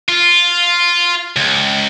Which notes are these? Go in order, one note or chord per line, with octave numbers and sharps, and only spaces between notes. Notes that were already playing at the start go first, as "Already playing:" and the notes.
F4
C#2